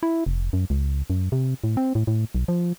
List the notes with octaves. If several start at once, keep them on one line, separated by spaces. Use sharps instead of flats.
E4
F1
F#2
C#2
F#2
C3
A2
C4
A2
A2
B1
F3